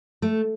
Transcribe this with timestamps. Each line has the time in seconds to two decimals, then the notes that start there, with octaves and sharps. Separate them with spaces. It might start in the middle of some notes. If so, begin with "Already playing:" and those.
0.22 A3